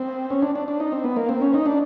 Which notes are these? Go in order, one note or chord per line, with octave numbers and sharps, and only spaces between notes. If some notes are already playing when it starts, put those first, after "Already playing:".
Already playing: C4
C#4
D4
D4
D4
D#4
C4
B3
A#3
C4
C#4
D#4
D4